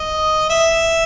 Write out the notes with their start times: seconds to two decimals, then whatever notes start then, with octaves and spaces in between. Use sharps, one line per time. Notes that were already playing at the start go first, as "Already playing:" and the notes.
Already playing: D#5
0.50 E5